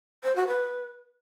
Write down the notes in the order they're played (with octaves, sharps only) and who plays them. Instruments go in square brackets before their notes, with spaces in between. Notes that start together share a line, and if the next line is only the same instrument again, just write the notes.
[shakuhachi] C5
F#4
B4